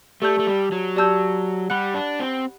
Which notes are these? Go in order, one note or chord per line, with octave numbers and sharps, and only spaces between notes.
A3 G4 D5 A5 E6 G6
A3
G3
F#3
G4 D5 A5 E6 G6
G3 F#5 B5 F#6
D4
C4